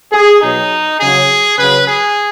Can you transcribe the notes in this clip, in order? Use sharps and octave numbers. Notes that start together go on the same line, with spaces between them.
G#4
B2 F#3 D#4
C#3 F#3 G#4
C#3 F#3 B4
G#4